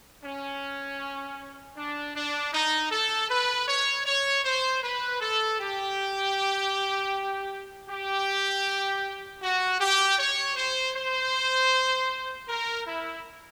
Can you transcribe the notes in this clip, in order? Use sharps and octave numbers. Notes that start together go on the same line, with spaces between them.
C#4
D4
D4
D#4
A4
B4
C#5
C#5
C5
B4
A4
G4
G4
F#4
G4
C#5
C5
C5
A#4
E4